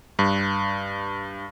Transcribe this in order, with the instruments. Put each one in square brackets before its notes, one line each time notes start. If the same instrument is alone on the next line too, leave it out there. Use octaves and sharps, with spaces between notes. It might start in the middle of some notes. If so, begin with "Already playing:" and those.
[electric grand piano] G2